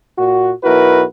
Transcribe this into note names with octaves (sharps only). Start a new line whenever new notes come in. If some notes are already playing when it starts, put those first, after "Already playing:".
A#2 F#4
B1 E4 F#4 A#4 B4